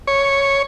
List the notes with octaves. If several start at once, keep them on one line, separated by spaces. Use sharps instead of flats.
C#5